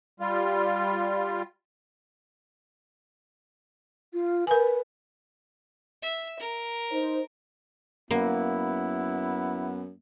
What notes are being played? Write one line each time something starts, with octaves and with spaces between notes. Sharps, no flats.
G3 F4
F4
A#4 B4 G#5
E5
A#4
D#4 C5
F#2 A#3 B3 E4